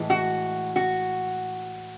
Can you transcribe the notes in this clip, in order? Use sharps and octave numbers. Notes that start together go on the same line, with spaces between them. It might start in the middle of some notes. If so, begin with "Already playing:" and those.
Already playing: A2 E3 G#3
F#4
F#4